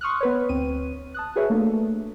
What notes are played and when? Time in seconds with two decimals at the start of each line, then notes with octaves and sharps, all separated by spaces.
0.01 C6 C#6 D#6 F6 F#6
0.21 B3 B4 C#5
0.49 D2 C4 D#7
1.14 A5 D#6 F#6
1.36 F#4 G#4 B4 C#5 E5
1.50 A3 A#3 D4 A4